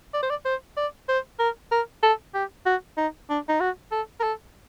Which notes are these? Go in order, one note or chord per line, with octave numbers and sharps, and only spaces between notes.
D5
C5
D5
C5
D5
C5
A#4
A#4
A4
G4
F#4
D#4
D4
D#4
F#4
A4
A#4
A4